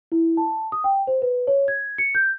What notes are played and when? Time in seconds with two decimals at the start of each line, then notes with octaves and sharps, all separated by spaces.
0.12 E4
0.37 A5
0.72 D#6
0.84 G5
1.07 C5
1.22 B4
1.47 C#5
1.68 G#6
1.98 C#7
2.15 G6